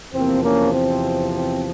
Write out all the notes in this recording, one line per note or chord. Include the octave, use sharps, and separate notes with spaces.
E2 C3 F3 A#3 C4
A#3 C#4
C4
C4